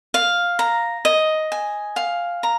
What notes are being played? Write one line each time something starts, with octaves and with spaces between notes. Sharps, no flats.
F5
A#5
D#5
G#5
F5
A#5